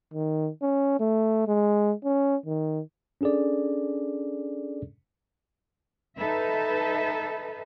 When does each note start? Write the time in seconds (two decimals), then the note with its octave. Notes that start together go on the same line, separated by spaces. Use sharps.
0.14 D#3
0.62 C#4
1.00 A3
1.47 G#3
2.04 C#4
2.46 D#3
3.21 C#4 D4 G#4 A4 D5
6.17 D#4 A4 B4 E5